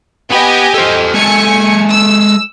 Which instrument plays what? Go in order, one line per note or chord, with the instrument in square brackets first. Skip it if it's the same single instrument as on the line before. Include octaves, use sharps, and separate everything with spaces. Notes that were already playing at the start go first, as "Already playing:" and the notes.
[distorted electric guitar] B3 B5 [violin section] G4 D#5 G#5
[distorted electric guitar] A4 C5
[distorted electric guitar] G#3 A4 [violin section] G#5 C#7
[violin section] E6